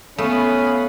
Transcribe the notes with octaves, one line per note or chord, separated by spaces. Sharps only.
A3 B3 C#4 F5 B5 D#6